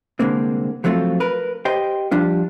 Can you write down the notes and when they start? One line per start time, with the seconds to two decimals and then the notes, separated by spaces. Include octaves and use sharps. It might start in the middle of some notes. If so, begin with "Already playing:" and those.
0.20 C2 D3 G#3 A#3 C4
0.84 F3 F#3 A3 C4 F4
1.20 A#4 B4
1.65 G4 C5 D#5 G5
2.11 F3 G3 D4 F4